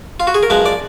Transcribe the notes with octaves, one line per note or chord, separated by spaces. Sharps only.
F4
F#4
G#4
A#4
F#2 F3 G#3 B4
D5